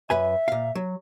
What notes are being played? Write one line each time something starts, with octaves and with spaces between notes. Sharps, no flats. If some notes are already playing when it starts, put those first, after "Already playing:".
F#2 B4 E5 G#5
A#2 F5
F#3